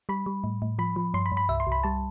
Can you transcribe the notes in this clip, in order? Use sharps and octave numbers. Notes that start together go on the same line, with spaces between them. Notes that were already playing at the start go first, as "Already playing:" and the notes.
G3 B5
G3
A2
A2
F3 B5
F3
G2 C6
B5
G2
B5
C2 E5
C6
C2
B5
G3 A5